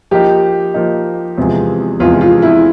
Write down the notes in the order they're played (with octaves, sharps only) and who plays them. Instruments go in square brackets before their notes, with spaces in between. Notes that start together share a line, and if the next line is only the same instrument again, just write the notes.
[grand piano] F3 A#3 D#4 [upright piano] G4
[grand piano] F3 A#3 D#4
E2 C3 F3 G#3
[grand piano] E2 C3 F3 G#3 [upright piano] F4
[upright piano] F4
E4